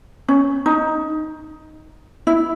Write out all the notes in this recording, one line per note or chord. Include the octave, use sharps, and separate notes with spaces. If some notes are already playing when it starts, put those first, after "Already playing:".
C#4
D#4
E4